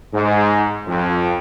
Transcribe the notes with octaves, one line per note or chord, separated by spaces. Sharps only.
G#2
F2